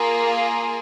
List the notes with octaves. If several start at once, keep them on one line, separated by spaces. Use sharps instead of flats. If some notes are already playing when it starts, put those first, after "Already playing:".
Already playing: A#3 F4 G#4